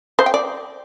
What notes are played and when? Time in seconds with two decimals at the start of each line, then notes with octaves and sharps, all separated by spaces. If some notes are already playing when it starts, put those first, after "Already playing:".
0.19 C5
0.26 G5
0.34 D5